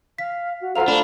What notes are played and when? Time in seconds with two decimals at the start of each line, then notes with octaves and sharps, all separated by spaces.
0.18 F5 B6
0.61 F#4
0.76 F4 A4 C5 F5 F#5 A#5 F7
0.88 A3 D4 B5 D6 F7